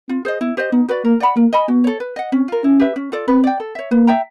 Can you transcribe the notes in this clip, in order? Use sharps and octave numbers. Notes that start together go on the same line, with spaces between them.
C4 F4
G#4 C5 D#5
B3 E4
G4 C5 D#5
B3 D#4
F#4 B4 D5
A#3 A#4
D5 F#5 B5
A#3 A#4
D#5 G#5 B5
B3 F#4
A4 C#5
B4
D#5 F#5
C4 C#4
F4 A#4
C#4 E4
G4 B4 E5
C#4
F4 A4 D5
C4 B4
D5 G5
A4
C#5 E5
A#3 B4
E5 G5 A#5